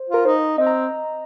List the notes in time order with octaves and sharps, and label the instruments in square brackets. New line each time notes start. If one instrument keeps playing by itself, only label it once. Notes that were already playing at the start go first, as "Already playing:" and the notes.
Already playing: [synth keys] C5
[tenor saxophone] F4 [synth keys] A#4
[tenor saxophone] D#4 [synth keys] C5
[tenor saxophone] C4 [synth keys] D#5
[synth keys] A#5